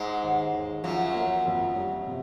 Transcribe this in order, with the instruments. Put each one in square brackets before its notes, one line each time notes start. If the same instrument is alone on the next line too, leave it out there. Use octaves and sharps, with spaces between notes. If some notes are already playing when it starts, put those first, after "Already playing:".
Already playing: [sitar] G#2 G#3
[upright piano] D#2
D#2
[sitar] F#2 F#3 [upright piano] F3
[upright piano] A#3
F2
G3
C3